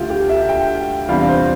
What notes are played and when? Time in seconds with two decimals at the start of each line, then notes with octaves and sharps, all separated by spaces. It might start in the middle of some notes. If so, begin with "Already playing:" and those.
Already playing: D2 F4 G4
0.10 G4
0.29 E5
0.49 G5
1.09 E2 C3 G3 D4 F4 F5
1.29 C5